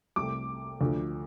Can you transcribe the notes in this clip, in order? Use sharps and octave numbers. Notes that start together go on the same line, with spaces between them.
C2 C3 A3 D6
D2 D3 F3